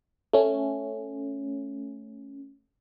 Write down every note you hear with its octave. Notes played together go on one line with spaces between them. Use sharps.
A3 C#4